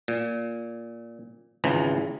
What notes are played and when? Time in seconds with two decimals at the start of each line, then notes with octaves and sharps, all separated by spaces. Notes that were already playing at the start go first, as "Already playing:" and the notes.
0.08 A#2
1.64 G#1 C#2 C#3 E3